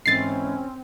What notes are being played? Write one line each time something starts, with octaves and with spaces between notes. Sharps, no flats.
G#2 E3 A3 C4 C#4 A6 C7